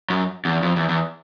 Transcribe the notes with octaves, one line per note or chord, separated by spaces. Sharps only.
F#2
E2
F2
E2
E2